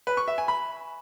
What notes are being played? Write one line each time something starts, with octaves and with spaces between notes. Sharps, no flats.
B4
C#6
E5
G#5
B5